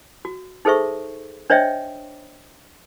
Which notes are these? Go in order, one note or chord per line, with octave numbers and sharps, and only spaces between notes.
F#4
D#4 G#4 A4 C5 E5 C#6
D4 C5 C#5 D#5 E5 G5